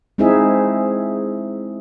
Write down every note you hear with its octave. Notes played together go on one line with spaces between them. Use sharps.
G#3 C4 D#4 E4 G#4 E5